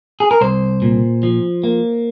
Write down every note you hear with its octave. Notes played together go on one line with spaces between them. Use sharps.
G#4
A#4
C2 C5
A#2
F3
A#3